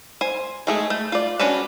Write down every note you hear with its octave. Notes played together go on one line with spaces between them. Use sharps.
C5 G#5
G#3 A3 G#4
A3
F4 D5
C#4 D4 F#4 B4 A5